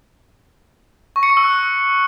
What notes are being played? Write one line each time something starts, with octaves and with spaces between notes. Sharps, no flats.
C#6
C#7
C#6
E6
F#6